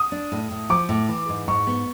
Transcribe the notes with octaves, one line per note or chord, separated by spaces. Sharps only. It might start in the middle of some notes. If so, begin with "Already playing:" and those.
Already playing: D#6
D4
A2
A2
F3 D6
A2
E3
G#2
G#2 C#6
B3